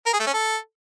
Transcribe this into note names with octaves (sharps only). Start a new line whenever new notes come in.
A#4
G#4
A3
C#4
A4